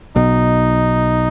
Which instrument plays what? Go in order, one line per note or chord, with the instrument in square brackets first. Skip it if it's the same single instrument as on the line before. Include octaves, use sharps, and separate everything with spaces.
[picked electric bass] B1 B2 [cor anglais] D#4